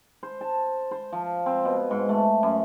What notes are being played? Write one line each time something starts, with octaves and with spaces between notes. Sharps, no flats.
C5
A5
C5
F3
C4
B2
G#2
A3
F#2